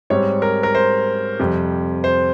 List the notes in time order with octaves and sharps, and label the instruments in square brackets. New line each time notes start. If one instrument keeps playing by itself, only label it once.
[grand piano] G#2 G3 C4 C#5
A#4
A#4
C5
F2 C3 G3
C5